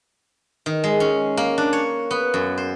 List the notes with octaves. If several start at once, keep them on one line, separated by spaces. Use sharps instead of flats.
D#3
G#3
C#4
A#3
D4
C#5
B3
F#2
C5